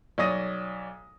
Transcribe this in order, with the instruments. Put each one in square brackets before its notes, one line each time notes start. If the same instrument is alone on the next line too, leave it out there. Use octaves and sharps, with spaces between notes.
[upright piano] B1 C#5 D5 D#6 A#6 D#7